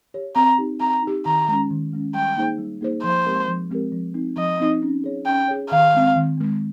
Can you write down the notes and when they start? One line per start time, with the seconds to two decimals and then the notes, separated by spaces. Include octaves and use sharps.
0.14 G4 C#5
0.36 C4 A#5
0.58 D#4 G4
0.80 C4 A#5
1.03 D#4 G4
1.26 D#3 A#5
1.48 G#3 C#4
1.70 D#3
1.93 G#3 C#4
2.14 G3 G5
2.36 A#3 D#4 G#4 C5
2.59 G3
2.81 A#3 D#4 G#4 C5
3.04 F3 C5
3.26 G#3 C4 G4 A#4
3.48 F3
3.70 G#3 C4 G4 A#4
3.92 F3
4.15 C4 D#4
4.37 F3 D#5
4.60 C4 D#4
4.82 C#4
5.04 G#4 C#5
5.26 C#4 G5
5.48 G#4 C#5
5.71 D#3 F5
5.94 G#3 C4
6.16 D#3
6.38 G#3 C4